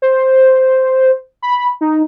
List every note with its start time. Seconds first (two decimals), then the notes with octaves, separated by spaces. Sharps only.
0.02 C5
1.42 B5
1.81 D#4